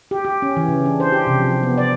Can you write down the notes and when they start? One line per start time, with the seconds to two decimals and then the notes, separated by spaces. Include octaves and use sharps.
0.11 G4
0.25 G4
0.42 C#4
0.57 E3
0.68 C#3
0.86 D4
1.00 C5
1.12 G4
1.27 C3
1.39 F3
1.63 B3
1.78 D5